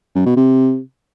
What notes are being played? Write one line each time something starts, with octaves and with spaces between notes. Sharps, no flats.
F#2
B2
C3